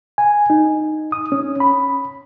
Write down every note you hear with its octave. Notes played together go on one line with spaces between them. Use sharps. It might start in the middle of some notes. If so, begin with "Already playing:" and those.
G#5
D#4
D#6
C#4
B5